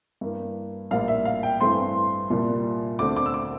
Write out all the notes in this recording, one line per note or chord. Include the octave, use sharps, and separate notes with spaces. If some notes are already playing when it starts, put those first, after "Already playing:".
G2 E3 A#3
A#1 A2 G3 A#3 F5
E5
F5
G5
G2 E3 A3 C4 C6
C2 A#2 G3 A#3
D2 D3 A3 C4 D6
D6
E6
D6